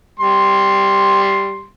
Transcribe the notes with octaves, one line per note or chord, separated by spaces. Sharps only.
G3 C6